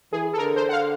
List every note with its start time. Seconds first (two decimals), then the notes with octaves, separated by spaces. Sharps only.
0.12 E3 G#4
0.33 A4
0.38 D3 A#4
0.56 C5
0.69 F#5
0.73 F5